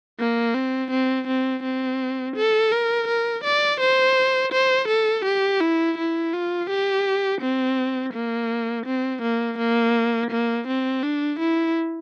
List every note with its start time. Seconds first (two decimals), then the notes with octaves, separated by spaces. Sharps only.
0.20 A#3
0.55 C4
0.91 C4
1.28 C4
1.63 C4
2.36 A4
2.72 A#4
3.08 A#4
3.44 D5
3.80 C5
4.52 C5
4.88 A4
5.25 G4
5.61 E4
5.98 E4
6.33 F4
6.70 G4
7.42 C4
8.14 A#3
8.86 C4
9.22 A#3
9.58 A#3
10.31 A#3
10.68 C4
11.03 D4
11.40 E4